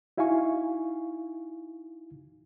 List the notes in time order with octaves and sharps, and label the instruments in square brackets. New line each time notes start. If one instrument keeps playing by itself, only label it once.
[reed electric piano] D#4 E4 F#4 F5 G#5 C#6